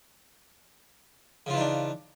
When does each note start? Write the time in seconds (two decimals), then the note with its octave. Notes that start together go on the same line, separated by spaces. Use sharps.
1.46 C#3
1.50 F4
1.53 E3
1.57 D#4
1.60 D4